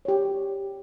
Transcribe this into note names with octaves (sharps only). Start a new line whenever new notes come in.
G4 C#5